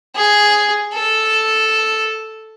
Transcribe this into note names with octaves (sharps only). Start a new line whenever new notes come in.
G#4
A4